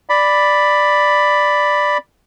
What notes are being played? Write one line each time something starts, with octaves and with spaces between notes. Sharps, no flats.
D5 B5